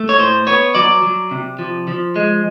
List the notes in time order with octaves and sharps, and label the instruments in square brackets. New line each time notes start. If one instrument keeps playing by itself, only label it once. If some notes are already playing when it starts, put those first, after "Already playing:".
Already playing: [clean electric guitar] A3
C#5
A2 C5
B3 C#5
F#3 D5
F#3
C3
F3
F3
G#3